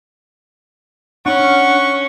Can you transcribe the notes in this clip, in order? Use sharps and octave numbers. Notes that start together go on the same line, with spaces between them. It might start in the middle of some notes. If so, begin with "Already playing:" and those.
C#4 D4 F#5 B5 C#6 F6